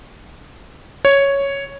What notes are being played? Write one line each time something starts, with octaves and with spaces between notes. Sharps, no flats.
C#5